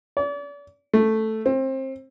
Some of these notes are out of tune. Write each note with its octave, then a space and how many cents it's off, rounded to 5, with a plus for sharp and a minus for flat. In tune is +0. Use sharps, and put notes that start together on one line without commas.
D5 -40
A3 +0
C4 +25